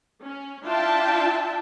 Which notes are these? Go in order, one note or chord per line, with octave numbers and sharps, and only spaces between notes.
C#4
D4 E4 F4 E5 G5 A5